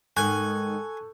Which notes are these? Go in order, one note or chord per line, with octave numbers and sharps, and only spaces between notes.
G#2 D#3 A4 G#5 C#6 F#6 G6